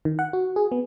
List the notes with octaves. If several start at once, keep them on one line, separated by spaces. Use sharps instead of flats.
D#3
F#5
F#4
G#4
B3